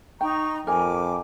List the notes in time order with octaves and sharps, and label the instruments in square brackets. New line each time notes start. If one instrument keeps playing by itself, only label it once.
[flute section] D#4 A#5 C#6 [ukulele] G5
[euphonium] F2 [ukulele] A#4 G#5 [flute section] D6